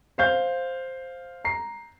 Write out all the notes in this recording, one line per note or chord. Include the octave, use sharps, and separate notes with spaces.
C5 F5 G6
A#5 C7